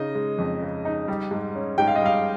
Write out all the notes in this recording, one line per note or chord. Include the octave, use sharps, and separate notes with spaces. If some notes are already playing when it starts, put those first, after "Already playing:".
Already playing: C#3 D#4 D#5
G#3
F2
C#3
D#4
G3
G#2
C#4
G#2 G5
F5
D#5
G3 F5